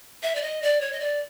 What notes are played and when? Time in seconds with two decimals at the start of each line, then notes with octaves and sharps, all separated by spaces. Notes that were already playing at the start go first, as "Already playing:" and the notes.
0.23 E5
0.35 D5
0.42 D#5
0.62 D5
0.81 C#5
0.92 D#5
1.00 D5